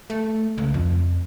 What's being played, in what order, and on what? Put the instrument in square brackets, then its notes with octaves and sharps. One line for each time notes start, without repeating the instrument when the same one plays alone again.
[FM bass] A3
C#2
F2